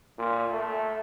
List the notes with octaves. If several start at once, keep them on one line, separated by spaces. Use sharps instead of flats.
A#2
A3